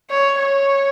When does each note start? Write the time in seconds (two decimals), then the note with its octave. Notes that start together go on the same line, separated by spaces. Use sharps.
0.10 C#5
0.38 C#5